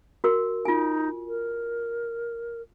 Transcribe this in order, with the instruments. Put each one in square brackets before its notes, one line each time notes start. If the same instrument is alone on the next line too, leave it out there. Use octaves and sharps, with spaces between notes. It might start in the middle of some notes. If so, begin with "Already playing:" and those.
[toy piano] F#4 A#4
[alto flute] D#4 [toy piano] F4 G#5
[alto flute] A#4